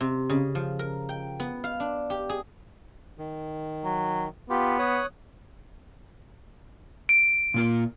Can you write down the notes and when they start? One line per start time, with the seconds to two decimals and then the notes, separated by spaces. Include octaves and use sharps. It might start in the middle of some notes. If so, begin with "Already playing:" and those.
0.01 C3
0.30 C#3
0.55 F3
0.79 A#4
1.09 G5
1.40 B3
1.64 F5
1.80 D4
2.10 G4
2.29 G#4
3.18 D#3
3.85 F#3
4.50 B3 F4 G4
4.79 C#5 D#6 F#6
7.09 D7
7.54 A#2 A#3 F4